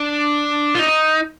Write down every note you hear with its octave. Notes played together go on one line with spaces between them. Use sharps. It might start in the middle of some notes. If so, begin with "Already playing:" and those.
Already playing: D4
F4
D#4